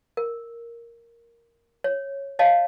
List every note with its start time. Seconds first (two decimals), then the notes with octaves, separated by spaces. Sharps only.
0.17 A#4
1.84 C#5
2.39 C#5 D#5 F5 A5